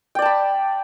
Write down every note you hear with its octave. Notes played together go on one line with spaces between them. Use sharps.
D5 G5 A5 B5